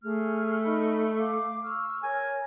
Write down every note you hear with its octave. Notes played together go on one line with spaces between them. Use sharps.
A3 G#4 F6
D#4 B5
F5 D6
C#6 E6 F6
A#4 C#5 G#5